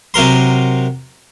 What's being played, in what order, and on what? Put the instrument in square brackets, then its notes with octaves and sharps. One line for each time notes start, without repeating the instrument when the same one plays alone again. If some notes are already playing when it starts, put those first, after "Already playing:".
[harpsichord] C3 F#3 A#4 C6